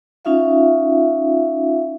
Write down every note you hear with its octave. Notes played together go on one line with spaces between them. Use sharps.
C#4 D#4 F4 E5 F5